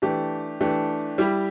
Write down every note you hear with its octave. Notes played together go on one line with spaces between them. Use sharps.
E3 A3 D4 G4
E3 A3 D4 G4
G3 E4 G4